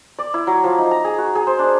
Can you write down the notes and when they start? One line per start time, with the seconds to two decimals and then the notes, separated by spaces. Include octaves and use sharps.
0.19 D5
0.34 E4
0.47 F#3
0.64 F3
0.78 D#4
0.91 A#5
1.04 G#4
1.18 F#4
1.35 G#4
1.47 C5
1.59 D4